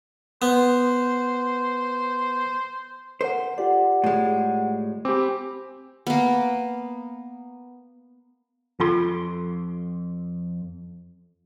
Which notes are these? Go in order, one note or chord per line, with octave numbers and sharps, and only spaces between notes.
B3 C5
A4 A#4 C5 F#5
F4 G4 D5 F#5
A2 G#3
C4 G4 G#5 B5 D6
A#3 B3
F2 F4 A4 C6